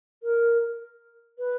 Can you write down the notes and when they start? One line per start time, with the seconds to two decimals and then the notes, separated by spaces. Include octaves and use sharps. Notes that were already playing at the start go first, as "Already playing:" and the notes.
0.23 A#4
1.39 B4